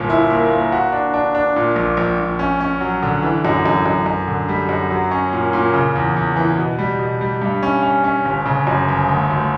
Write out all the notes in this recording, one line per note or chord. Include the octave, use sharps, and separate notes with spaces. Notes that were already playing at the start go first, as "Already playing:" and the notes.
Already playing: G1 A#2
E4
A#3
A#3
F#4
D4
D4
D4
A#2
A#1
A#1
A#1
C#4
C#4
F#3
D3
E3
F#2
F#2
F#2
F#2
D3
G3
F#2
F#3
C#4
A#2
A#2
C#3
E2
E2
E3
B2
G3
B2
G3
G2
C#4
C#4
C#4
G1
C#3
F#2
G1
D2
D2